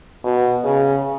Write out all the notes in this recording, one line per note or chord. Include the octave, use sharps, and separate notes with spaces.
B2
C#3